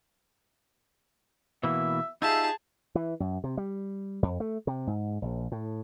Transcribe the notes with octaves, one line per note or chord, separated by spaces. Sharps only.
B2 E3 A#3 E5
D#4 F4 G4 G#4 E5 A5
E3
F#2
C3
G3
F2
A3
C3
G#2
A#1
A2